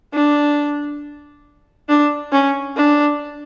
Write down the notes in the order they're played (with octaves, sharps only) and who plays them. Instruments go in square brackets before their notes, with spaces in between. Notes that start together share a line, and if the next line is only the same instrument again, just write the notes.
[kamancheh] D4
D4
C#4
D4